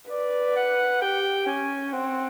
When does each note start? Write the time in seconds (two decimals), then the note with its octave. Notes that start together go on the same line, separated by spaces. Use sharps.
0.11 B4 D5
0.56 F#5
1.02 G4 G5
1.47 C#4 G#5
1.93 C4 F#5